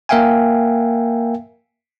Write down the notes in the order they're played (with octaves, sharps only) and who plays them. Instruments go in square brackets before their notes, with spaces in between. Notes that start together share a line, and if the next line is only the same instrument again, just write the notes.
[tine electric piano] A#3 A#4 E5 F5 G5 G#5